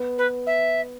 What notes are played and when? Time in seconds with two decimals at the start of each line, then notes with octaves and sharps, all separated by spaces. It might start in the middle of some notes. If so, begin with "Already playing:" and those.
Already playing: B3
0.18 B4
0.47 E5